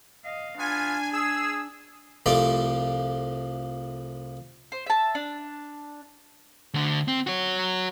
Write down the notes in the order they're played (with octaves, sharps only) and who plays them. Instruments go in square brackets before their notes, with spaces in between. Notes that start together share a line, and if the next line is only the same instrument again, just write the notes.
[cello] D#5 F5
[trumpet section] B3 F4 [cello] D4 [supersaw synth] G#5
[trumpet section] G#4 [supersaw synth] E6
[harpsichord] C2 F3 A3 D5
[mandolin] C5
E5 A5
D4
[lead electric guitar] D2 D3
C4
F#4 C#5